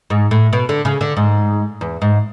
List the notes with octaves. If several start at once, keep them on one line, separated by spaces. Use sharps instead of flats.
G#2
A2
B2
D3
C#3
D3
G#2
E2
G#2